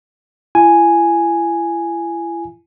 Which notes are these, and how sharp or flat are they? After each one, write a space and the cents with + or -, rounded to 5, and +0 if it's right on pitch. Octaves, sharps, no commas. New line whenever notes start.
E4 +40 G#5 +0